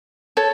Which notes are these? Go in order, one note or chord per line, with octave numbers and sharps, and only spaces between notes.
A4 C#5